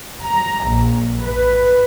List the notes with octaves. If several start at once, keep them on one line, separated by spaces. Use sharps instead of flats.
A#5
A#1
B4